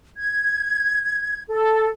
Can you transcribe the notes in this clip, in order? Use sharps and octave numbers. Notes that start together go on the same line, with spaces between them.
G#6
A4